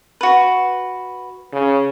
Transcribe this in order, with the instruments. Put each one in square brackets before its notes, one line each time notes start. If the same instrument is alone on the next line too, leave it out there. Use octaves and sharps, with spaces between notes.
[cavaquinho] F#4 B4
[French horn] C#3